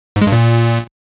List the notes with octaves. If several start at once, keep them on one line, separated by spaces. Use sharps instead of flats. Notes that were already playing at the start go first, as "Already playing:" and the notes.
G#2
G#3
G2
A#2